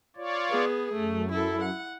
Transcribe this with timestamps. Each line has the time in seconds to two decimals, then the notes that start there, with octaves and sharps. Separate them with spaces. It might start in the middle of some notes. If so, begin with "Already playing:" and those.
0.16 F4 C#5 D5
0.50 B3 G#4
0.94 F#2 A3
1.32 E4 A4
1.62 F#5